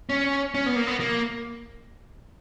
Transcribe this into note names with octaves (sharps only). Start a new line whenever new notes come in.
C#4
C#4
B3
A#3
B3
A#3